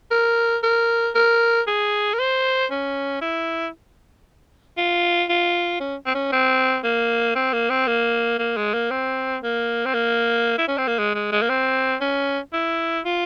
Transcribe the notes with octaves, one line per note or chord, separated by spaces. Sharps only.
A#4
A#4
A#4
G#4
A#4
C5
C#4
E4
F4
F4
C#4
C4
C#4
C4
A#3
C4
A#3
C4
A#3
A#3
G#3
A#3
C4
A#3
C4
A#3
E4
C#4
C4
A#3
G#3
G#3
G#3
A#3
C4
C#4
E4
F4